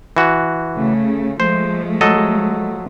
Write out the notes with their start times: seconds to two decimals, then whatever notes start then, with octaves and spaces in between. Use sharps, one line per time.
0.17 E3 F#4
0.75 C#3 A3
1.40 F3 G#3 A3 C5
2.01 F#3 A4 D#5